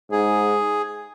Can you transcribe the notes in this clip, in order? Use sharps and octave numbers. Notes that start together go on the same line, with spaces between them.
G#2 G#4